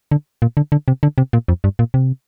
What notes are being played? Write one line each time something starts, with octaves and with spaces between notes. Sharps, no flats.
D3
A#2
D3
D3
C3
D3
C3
A#2
F2
G2
A#2
C3